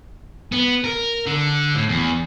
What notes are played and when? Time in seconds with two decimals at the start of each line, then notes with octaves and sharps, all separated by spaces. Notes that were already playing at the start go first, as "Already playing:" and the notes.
0.52 B3
0.84 A#4
1.26 D3
1.75 A2
1.89 E2